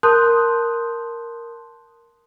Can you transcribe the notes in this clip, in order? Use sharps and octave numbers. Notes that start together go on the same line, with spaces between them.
A#4 A5 C6 D#6 F#6 G6